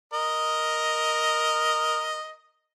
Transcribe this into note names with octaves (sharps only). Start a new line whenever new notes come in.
A#4 D#5